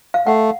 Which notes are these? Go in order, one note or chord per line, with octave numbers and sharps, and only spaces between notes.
F5
A3 F#5